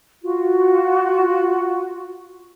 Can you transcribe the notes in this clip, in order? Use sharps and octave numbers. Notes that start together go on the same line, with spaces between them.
F4 F#4